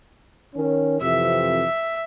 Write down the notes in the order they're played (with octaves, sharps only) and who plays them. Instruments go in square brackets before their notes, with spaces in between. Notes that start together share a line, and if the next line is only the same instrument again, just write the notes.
[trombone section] D#3 C#4
[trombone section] F2 C3 E3 [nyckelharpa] E5